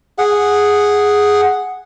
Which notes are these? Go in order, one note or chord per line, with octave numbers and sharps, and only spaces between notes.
G#4 F#5